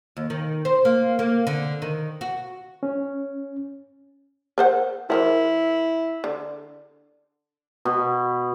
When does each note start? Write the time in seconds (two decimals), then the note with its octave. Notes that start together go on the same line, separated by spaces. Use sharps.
0.17 D#2
0.30 D#3
0.65 C5
0.85 A#3
1.19 A#3
1.47 D3
1.82 D#3
2.21 F#4
2.83 C#4
4.58 A#4 C5 F#5
5.10 E3 E4 A#4 C5
6.24 D3
7.85 B2